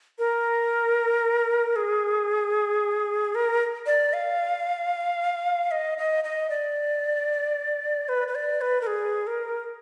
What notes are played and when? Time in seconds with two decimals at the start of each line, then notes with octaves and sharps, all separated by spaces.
0.19 A#4
1.76 G#4
3.35 A#4
3.86 D5
4.13 F5
5.71 D#5
5.98 D#5
6.24 D#5
6.50 D5
8.09 B4
8.28 B4
8.35 D5
8.61 B4
8.81 A#4
8.87 G#4
9.27 A#4